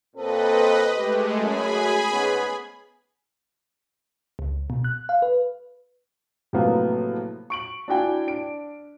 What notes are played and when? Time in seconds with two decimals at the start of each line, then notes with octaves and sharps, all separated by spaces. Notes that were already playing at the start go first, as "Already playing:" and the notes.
0.16 A#2 C4 A4 B4 D#5
0.97 G#3 A3 G4
1.38 F#2 G#4 G#5 B5
2.10 G#2 B3 C#4
4.39 C#2
4.70 B2
4.84 F#6
5.09 F5
5.22 B4
6.53 A2 C3 F3 F#3 A#3 B3
7.50 C#6 D7 F#7
7.88 D4 E4 F#4 G5 G#5
8.27 D4 D7